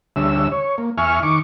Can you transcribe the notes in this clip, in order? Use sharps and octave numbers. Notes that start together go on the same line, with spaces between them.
D2 D3 G3 C#4 E5 E6
C#5
A#3
E2 E5 G#5 C#6 F6
D#3 C#6 D6